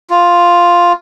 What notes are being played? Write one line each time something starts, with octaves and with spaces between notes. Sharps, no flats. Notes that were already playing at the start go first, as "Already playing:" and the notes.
F4